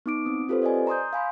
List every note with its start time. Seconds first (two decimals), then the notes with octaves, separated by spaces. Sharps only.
0.06 B3 D#4 D6 D7
0.25 C4 D#6
0.48 C4 F4 G4 A4 B4 C5
0.62 C5 D5 D#5 G#5
0.87 A#5 C6 D#6 G6
1.13 F5 G#5 B5 C6